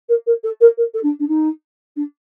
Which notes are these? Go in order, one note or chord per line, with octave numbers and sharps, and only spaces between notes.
A#4
A#4
A4
A#4
A#4
A4
D4
D4
D#4
D4